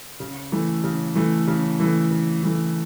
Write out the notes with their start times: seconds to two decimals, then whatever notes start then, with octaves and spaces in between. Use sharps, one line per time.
0.20 C#3
0.52 E3 A3
0.84 C#3
1.15 E3 A3
1.47 C#3
1.80 E3 A3
2.11 C#3
2.43 E3 A3